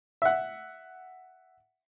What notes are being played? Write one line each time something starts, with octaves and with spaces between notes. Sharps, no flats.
E5 F#5